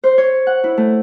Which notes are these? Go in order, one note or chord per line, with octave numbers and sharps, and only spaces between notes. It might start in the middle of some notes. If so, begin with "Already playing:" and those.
C5
C#5
F#5
E4
A3